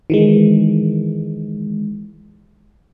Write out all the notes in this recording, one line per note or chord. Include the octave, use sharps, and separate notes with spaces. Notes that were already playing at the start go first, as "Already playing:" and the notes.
D#3 E3 G#3